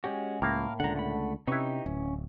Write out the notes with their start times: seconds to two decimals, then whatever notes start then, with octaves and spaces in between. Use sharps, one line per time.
0.04 G#3 C#4 F#4 G4
0.42 C#2 A2 A#3 A#4 F5
0.80 C#2 D3 F#5 A#5
0.96 A3 F#5 B5
1.47 C3 C#4 D#4 E4 G4 B4 C#6
1.86 D1 C#4